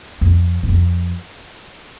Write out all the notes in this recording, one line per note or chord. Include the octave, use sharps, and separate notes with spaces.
F2
F#2
F2